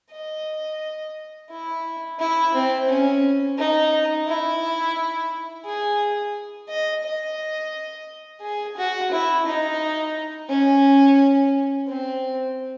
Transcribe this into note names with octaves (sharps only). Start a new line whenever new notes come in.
D#5
E4
E4
C4
C#4
D#4
E4
G#4
D#5
D#5
G#4
F#4
E4
D#4
C#4
C4